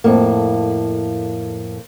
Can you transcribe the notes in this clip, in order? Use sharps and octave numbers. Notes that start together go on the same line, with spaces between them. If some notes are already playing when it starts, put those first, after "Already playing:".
F2 A2 A#3